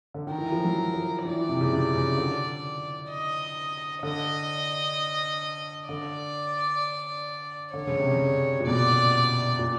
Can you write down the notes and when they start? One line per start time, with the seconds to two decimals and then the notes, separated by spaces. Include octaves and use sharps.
0.14 D3
0.27 D#3
0.32 A#4
0.38 E3
0.52 F3
0.64 F#3
0.94 F3
1.25 E3 D5
1.49 C3
1.61 C#3
1.72 C3
1.95 C#3
2.18 D3
3.11 D#5
4.03 D3 D#5
5.89 D3 D5
7.74 D3 C#5
7.87 C#3
7.99 C3
8.11 C#3
8.60 A#2
8.67 B2 D5
9.59 A#2